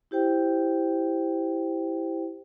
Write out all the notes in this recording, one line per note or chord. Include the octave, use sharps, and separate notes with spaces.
E4 G4 C5 G5